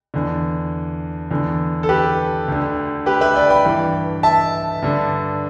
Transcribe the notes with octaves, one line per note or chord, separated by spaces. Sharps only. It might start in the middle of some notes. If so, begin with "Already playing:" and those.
E2 D3
E2 D3
A4
G4 B4
D2 D3
G4 B4
B4 E5
D5 G5
G5 B5
G2 E3
E5 A5
G2 D3